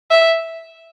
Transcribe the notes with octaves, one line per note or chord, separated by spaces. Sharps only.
E5